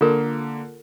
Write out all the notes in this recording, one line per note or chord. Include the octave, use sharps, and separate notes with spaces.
D3 A#3 F4 A4 A#4